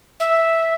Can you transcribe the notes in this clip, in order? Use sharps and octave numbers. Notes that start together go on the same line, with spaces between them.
E5